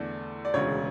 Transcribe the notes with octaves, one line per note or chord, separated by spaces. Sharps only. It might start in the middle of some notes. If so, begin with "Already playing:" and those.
Already playing: E2 D3 A3 D5
D5
E1 D2 C#3 G#3 C#5